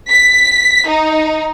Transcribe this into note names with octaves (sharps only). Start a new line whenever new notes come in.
B6
D#4